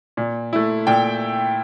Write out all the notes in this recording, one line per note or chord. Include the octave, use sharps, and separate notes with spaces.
A#2
A3 E4
A#2 G5